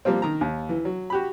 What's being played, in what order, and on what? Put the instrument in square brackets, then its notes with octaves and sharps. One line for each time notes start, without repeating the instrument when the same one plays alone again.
[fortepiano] F3 G3 A#3 C4
D#3 A#5
D#2
E3
F#3
F#4 G4 B5